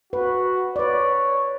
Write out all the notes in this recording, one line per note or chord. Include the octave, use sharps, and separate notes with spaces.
F#4 B4
B4 C#5 D5